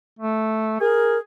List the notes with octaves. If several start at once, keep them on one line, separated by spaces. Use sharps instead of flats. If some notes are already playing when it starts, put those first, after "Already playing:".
A3
G#4 A#4